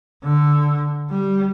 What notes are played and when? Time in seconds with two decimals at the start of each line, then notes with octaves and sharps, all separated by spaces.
0.24 D3
1.10 G3